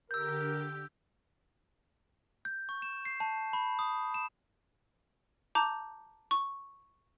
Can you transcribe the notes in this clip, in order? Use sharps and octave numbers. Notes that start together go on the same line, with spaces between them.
D3 G4 A#4 E6 G6
G6
C#6
E7
C7
A5
B5
D#6
E7
A5 A#5 D6 G6
C#6